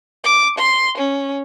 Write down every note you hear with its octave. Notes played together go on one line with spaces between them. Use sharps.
D6
C6
C#4